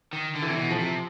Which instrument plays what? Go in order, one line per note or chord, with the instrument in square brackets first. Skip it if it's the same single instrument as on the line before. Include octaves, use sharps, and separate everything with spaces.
[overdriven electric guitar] D#3
D3
[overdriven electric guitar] C3 [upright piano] E3
[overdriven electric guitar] B2
[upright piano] F3
[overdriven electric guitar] C3